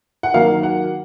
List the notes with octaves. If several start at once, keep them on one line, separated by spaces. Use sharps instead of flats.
F#5
D#3 F#3 A#3 F5
F#5